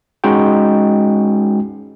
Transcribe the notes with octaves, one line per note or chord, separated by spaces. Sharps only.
G#3 C#4 D#4 F#4 G5